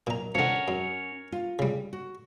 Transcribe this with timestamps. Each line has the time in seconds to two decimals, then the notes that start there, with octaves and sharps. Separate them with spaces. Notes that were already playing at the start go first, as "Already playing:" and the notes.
0.07 B1 A#2 A#5
0.35 D3 F3 C#4 A#4 C#5 F#5
0.68 F#2
1.32 F4
1.59 C#3 G3
1.93 F#4